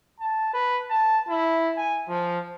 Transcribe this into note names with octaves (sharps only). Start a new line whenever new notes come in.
A5
B4
A5
E4
G#5
F3